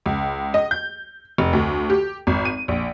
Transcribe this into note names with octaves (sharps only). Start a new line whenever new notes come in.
C#2
D#5
G6
F1
D2
G4
G#1
D#7
A#1